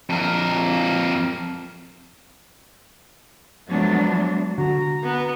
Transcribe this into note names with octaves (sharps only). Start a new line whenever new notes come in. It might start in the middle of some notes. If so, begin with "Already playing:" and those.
F2 A#4
F3 F#3 G#3 A3 B3 D4
D3 F#4 A#5
B3